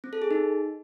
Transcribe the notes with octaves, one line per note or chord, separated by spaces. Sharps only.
C4
A4
G#4
D#4